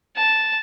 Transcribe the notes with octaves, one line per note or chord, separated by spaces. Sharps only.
A5